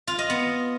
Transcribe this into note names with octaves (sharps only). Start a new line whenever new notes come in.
F4
D#5
B3